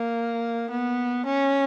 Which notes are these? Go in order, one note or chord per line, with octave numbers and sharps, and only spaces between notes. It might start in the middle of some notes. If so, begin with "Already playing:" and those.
Already playing: A#3
B3
C#4